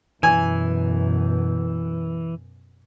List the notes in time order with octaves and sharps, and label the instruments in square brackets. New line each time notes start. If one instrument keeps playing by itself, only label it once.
[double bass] F#2 B2 [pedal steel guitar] E3 [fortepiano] G#5